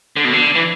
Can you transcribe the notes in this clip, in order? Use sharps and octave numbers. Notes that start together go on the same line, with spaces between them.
D3
B2
D3
E3